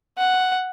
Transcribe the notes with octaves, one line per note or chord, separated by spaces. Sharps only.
F#5